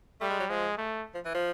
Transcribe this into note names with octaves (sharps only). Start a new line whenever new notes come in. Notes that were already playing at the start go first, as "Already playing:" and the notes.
G3 A3
G#3
F#3
F3 G#3
A3
F3
E3
F3